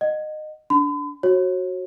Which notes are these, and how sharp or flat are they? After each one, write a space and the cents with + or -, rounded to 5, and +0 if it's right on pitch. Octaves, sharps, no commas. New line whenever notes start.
D#5 -20 F#5 +0
D4 -15 B5 +45
F#4 +0 C#5 -35